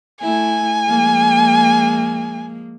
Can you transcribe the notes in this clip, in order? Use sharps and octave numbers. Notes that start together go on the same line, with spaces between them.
A3 E4 G#5
F3 G#3 A#3